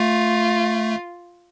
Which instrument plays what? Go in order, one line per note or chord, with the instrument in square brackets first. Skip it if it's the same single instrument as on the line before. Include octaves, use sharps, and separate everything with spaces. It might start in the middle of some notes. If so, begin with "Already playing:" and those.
Already playing: [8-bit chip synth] A3 [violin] F4